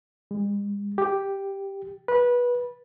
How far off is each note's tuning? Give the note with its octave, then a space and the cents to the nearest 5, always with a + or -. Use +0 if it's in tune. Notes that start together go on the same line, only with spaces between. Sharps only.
G#3 -45
G4 +0
B4 -20